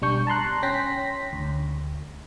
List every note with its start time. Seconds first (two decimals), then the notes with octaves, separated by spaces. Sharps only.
0.02 B1 G3 D4 C#6 G6
0.27 A5 A#5 C6 F#6
0.63 C#4 G5 C6 A#6 B6
1.33 D2